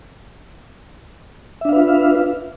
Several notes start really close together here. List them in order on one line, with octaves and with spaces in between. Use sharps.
E5 D4 F5 B4 F4